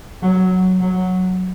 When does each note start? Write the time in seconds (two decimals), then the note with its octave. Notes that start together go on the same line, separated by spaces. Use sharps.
0.22 F#3
0.80 F#3